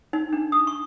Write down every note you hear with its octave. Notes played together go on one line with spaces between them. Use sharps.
D#4
D4
D#6
C#6